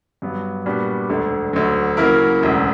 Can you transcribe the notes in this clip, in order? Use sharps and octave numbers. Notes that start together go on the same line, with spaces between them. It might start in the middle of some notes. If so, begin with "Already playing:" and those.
G2 F#3 B3
A#2 G3 B3 D4 F#4
E1 D2 D3
D2 D3 F#3
C#3 F#3 A#3 E4 A#4
E1 D2 C#3